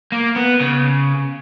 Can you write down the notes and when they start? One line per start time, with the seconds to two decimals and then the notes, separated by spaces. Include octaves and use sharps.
0.12 A#3
0.36 B3
0.61 C#3